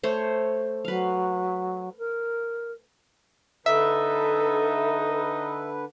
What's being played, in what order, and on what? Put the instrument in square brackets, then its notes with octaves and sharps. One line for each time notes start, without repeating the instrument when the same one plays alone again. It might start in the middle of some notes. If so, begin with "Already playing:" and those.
[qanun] A3 C5 C#5
[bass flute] F#3 [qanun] B4 F5
[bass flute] A#4
[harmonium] D3 B4 [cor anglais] D#4 [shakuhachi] A4 [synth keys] E5